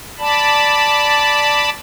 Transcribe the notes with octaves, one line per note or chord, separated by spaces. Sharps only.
D5 A5 B5